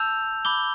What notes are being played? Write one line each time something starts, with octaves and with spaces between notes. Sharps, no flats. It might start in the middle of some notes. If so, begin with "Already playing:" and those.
Already playing: A5 E6 G6 F7
B5 D6 G6 G7